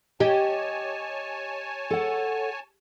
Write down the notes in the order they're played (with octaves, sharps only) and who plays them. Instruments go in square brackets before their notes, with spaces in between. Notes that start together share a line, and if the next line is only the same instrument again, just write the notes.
[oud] G4 [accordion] C#5 G#5 A5 [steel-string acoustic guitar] D#5
[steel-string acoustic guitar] A4 F#5